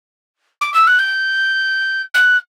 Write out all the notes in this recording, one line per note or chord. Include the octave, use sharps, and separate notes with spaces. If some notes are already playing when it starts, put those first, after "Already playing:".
D6
E6
F#6
G6
F#6